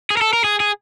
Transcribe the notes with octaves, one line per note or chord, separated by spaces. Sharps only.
G#4
A#4
A4
A#4
G#4
G#4